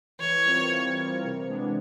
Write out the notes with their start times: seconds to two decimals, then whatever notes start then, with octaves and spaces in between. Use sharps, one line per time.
0.19 E3 C#5
0.45 G3 C4 F4 A#4
0.71 E3
0.97 G3 C4 F4 A#4
1.23 C3
1.49 E3 G#3 B3 D4